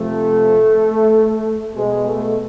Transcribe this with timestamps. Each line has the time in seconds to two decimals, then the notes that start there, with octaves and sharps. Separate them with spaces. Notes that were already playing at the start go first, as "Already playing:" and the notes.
Already playing: C3 F3 A3
1.75 B2 G#3
2.06 A3